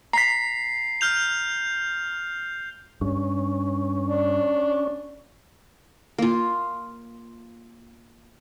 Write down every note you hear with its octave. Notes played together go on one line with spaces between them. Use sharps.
A#5 B6 C7
F6 G6 F7
G2 C#4
D4
A#3 F4